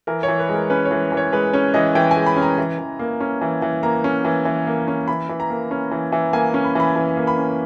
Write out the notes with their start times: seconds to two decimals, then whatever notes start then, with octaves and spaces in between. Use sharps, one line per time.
0.07 E3 A#4
0.23 C#5
0.28 E3
0.39 B4
0.49 G#3
0.54 A#4
0.70 C#4 B4
0.85 C#5
0.91 E3
1.12 E3
1.17 C#5
1.32 G#3 B4
1.53 C#4 C#5
1.74 E3 D#5
1.95 E3 G5
2.11 G#5
2.16 G#3
2.26 B5
2.36 C#4
2.42 A#5
2.58 E3
2.79 E3
2.99 A#3
3.20 C#4
3.41 E3
3.62 E3
3.83 A#3 A#5
4.04 C#4
4.25 E3
4.45 E3
4.67 A#3
4.88 C#4
5.08 E3 B5
5.29 E3
5.40 A#5
5.50 A#3
5.71 C#4
5.91 E3
6.12 E3
6.33 A#3 G#5
6.54 C#4
6.64 B5
6.75 E3 B5
6.96 E3
7.17 A#3
7.27 B5
7.38 C#4